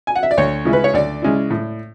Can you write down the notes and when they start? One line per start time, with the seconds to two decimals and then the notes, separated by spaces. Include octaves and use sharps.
0.07 G#5
0.16 F#5
0.23 E5
0.31 D5
0.38 D2 C#5
0.65 C#3 G#3 C#4 E4
0.73 B4
0.84 C#5
0.94 D2 D5
1.22 C#3 G#3 C#4 E4
1.50 A2